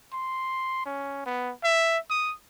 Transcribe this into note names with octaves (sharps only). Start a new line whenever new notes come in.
C6
C#4
B3
E5
D#6